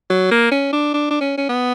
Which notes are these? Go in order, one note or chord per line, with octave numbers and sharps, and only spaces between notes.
F#3
A#3
C#4
D4
D4
D4
C#4
C#4
B3